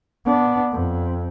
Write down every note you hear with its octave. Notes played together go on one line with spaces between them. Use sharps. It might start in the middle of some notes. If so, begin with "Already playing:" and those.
B3 D4
F2